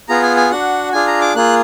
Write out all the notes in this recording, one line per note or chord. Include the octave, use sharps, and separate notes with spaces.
B3 F4 G#4 A#5
G#5
G#5
D4 F#4 F#5
D4 F4 G#4 G#5
A#5
D6
A#3 F4 G#4 F#6